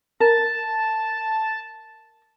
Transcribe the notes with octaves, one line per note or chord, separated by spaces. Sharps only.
A#4 A5